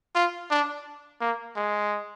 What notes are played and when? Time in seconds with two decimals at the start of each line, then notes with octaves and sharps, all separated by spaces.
0.15 F4
0.51 D4
1.21 A#3
1.56 G#3